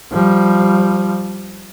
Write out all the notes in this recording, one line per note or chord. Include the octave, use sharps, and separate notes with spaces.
F3 G3